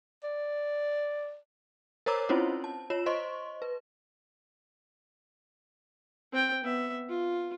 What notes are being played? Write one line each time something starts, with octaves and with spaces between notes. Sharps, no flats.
D5
A#4 C5 C#5 A#5 D6 E6
C4 C#4 E4 F4 C5 C#5
A5
F4 C#5 E7
C5 D#5 C6 C#6
B4
C4 G5
B3 E5
F4